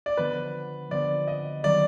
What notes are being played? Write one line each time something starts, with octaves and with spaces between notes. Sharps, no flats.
D5
D3 F3 B3 D4 B4
D3 F3 B3 D4 D5
D#5
D#3 F#3 B3 D5